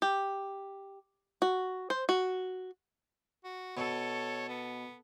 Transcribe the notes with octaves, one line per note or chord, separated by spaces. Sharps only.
G4
F#4
C5
F#4
F#4
B2 A4 C#5
B3